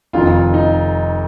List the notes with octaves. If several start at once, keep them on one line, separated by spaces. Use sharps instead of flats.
F1 F2 D#3 F4
D#4